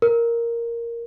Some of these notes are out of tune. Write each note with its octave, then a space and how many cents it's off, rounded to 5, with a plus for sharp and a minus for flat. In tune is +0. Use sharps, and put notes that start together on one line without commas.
A#4 +0